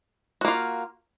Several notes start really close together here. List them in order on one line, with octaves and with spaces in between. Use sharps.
F#4 A#3 F4